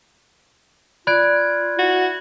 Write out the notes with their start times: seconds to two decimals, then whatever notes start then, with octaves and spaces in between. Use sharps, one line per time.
1.07 F4 D5 B5 F#6 G#6 D7
1.78 E4 F#4